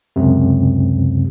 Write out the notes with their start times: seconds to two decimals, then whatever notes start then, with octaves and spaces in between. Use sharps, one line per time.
0.16 C#2 F#2 C3